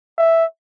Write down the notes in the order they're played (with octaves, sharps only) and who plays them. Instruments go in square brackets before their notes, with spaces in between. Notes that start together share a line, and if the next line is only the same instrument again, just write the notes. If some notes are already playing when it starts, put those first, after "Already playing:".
[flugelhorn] E5